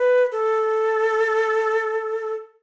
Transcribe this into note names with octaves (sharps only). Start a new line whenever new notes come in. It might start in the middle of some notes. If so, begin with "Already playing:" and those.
Already playing: B4
A4